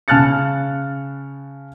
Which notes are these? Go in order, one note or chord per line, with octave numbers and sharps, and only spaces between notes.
C#3 A5 F6 F#6 A6 C#7